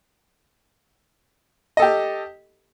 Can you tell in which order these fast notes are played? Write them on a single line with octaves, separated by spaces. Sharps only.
D#5 A4 G4